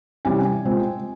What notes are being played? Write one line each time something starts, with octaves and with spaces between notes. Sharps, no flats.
C3 E3 G3 C#4 G#5
A#2 G#3 C4